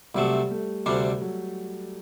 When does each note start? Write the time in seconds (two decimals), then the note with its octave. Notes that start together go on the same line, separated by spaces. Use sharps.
0.15 C2 C3 F#3 G3 A3
0.50 A3
0.85 D2 C3 G3 A3 D4
1.22 F#3